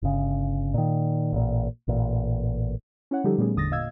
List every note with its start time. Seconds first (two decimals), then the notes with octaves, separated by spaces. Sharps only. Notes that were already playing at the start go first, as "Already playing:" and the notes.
0.02 G1 C#3
0.74 A#2 D#3
1.33 A1 A#2
1.88 A1 A#2
3.11 C#4 E4 C#5 F#5
3.24 D3 F3 G3 D#4 G4 A4
3.38 A#2 G3 A3 B3 C#4 G#4
3.55 G#1 E2 D3 D#6 A6 A#6
3.71 A#2 D#5 F5 E6 G#6